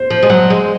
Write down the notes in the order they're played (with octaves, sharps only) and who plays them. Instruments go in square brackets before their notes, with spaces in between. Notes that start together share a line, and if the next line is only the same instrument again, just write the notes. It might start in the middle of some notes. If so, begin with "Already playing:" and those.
Already playing: [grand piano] C5
[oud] F3
G#3
F#3
G#3